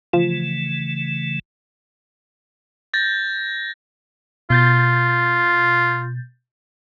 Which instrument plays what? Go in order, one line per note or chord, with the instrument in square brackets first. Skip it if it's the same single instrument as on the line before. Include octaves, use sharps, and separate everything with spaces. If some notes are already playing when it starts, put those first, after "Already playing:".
[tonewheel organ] C#3 E3 A3 [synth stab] F3
[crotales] G6 A6 A#6
[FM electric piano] B2 G6 A6 [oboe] F4